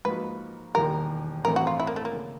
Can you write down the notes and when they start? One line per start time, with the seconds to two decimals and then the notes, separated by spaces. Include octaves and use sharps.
0.05 G#2 F3 A#3 D#4 F#4 B4
0.74 E1 D#2 D#3 G3 A#4
1.44 A1 G2 E3 A3 C4 A#4
1.56 F#4
1.67 F4
1.80 E4
1.87 A#3
1.96 A3
2.05 A#3
2.13 C#3